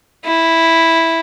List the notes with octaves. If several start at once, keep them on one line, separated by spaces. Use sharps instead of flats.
E4